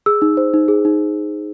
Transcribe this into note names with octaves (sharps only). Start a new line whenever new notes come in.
G#4 E6
D#4
C5
D#4
G#4
D#4